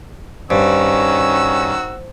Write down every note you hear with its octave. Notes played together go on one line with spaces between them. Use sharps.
G2 D#3 C#4 F#4 C5 E6